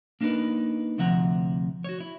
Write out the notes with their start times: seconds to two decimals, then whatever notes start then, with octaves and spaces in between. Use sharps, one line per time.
0.21 A#3 D4 D#4 G4 A#4 B4
0.98 D2 C3 F3 E5 F#5 A#5
1.84 F#4 C#5
2.00 E4